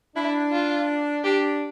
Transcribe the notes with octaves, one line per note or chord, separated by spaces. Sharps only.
D4 E4
F4
D4 G4